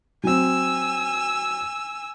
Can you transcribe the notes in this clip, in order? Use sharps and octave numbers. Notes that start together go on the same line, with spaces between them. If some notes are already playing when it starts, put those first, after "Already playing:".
F#3 C4 G#5 E6